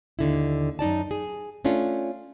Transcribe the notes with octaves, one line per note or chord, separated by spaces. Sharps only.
D#2 D3 E4
F#2 D#4 D5 A5
G#4
A3 C#4 D4 F4